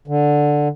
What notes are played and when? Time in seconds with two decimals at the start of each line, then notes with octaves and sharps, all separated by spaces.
0.08 D3